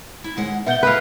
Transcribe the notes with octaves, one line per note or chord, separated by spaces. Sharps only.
E4
D#2 G#3 F#5
B2 B3 E5 F#5 G6 G7
E4 F#4 G#4 B4 F5